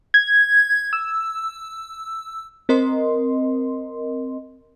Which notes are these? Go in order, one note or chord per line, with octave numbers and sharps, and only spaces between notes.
G#6
E6
C4 A#4 D#5 C6